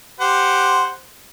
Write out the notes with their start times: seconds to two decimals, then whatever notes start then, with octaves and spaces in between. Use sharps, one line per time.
0.20 G4 C5 F#5